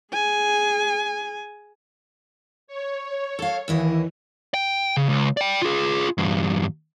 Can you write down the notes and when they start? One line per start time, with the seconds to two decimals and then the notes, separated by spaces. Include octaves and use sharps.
0.13 G#4 G#5
2.68 C#5
3.39 A4 F5
3.68 D#2 E3 E4 D#5
4.54 G5
4.97 C#3
5.09 C#2
5.37 D5 G5
5.62 F4 G#4
6.18 E2 G2